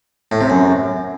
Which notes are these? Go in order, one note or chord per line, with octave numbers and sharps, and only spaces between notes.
A2
C3
F#2